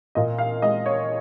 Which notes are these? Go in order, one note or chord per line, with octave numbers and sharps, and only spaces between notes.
A#2 D#5
F5
G#3 D#5
C#5